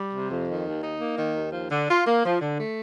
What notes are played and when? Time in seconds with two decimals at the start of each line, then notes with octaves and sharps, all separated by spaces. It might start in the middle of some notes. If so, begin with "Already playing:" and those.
Already playing: G3
0.11 C3
0.29 F2
0.46 D#3
0.64 D#2
0.82 D#4
0.99 A#3
1.17 D#3
1.35 D#2
1.52 F3
1.70 D3
1.88 F4
2.05 A#3
2.23 F3
2.41 D3
2.58 A3